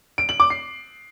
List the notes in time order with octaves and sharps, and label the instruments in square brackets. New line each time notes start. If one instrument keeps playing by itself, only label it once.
[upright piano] D7
F#7
D6
C7